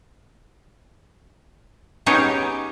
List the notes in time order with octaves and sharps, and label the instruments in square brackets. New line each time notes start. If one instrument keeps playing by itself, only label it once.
[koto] B3 C#4 D#4 G4 G#4 C#5